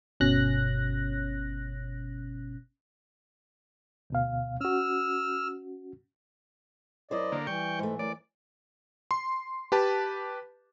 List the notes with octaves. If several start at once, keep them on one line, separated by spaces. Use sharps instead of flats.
G1 B2 C#4 F#6 A#6
D2 B2 F5
C#4 F#4 E6 F6
F#2 E4 C5 D5 D#5
D3 A#3
E3 G3 G5 C#6
G#2 A3
F#2 D5
C6
G4 B4 A5